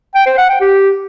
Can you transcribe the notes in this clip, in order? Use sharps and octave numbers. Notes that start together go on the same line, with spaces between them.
G5
C5
F#5
G5
G4